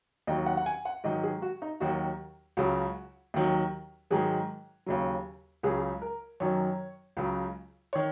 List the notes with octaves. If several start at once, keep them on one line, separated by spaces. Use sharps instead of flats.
D#2 D#3 F#3 D#5
F#5
F#5
G#5
F#5
G#2 D#3 F#3 D#5
G#4
F#4
D#4
D#2 D#3 F#3 F#4
C#2 C#3 F#3 F#4
D#2 D#3 F#3
G#2 D#3 F#3 G#4
D#2 C#3 F#3
C#2 C#3 F#3 G#4
A#4
F#2 D#3 F#3 C#5
C#2 C#3 F#3
D#3 C#5